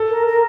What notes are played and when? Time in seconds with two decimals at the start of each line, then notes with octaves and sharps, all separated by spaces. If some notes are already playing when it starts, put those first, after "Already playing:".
Already playing: A4
0.09 A#4
0.26 A#4